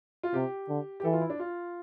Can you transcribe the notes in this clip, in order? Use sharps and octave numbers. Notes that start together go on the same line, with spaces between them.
F4
C3 G4
D3
G4
E3 A4
F4
E4
D4
F4